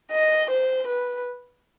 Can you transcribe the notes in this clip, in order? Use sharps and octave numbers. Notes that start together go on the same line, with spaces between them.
D#5
C5
B4